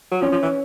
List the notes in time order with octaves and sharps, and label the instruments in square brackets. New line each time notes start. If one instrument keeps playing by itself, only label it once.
[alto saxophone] F#3
[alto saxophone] F3 [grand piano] C#4
[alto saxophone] F3
E3